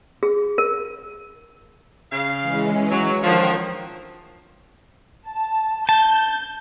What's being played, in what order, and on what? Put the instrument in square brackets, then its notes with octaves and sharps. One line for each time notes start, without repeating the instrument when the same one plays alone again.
[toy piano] G#4
A#4
[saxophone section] C#3 F5
[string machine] E3 G#3 C#4
[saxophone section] F#3 [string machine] C#5
[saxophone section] D3 D#3 F3 [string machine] A#4 G5 C#6
[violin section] A5
[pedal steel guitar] A5 [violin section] G6